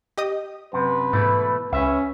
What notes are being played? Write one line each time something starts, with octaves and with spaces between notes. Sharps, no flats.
G4 D#5 D#6
F#2 C3 B4
G#2 B2 E3 A3
C#2 C#4 B4 E5